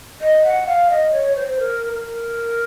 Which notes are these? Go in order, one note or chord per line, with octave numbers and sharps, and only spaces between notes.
D#5
F#5
F5
D#5
C#5
C5
A#4
A#4